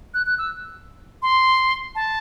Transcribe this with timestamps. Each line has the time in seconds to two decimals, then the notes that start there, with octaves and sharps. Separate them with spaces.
0.14 F#6
0.26 F#6
0.38 E6
1.22 C6
1.95 A5